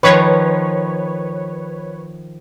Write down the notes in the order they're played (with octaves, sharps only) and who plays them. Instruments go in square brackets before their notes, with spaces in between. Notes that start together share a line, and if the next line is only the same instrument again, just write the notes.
[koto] D#3 F3 [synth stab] B4 C#5